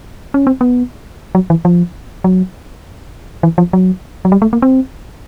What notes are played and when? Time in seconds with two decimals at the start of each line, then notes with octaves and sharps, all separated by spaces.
0.34 C#4
0.47 C4
0.61 B3
1.35 F#3
1.50 E3
1.65 F3
2.24 F#3
3.43 E3
3.58 F3
3.73 F#3
4.25 F#3
4.32 G3
4.42 A3
4.53 A#3
4.62 C4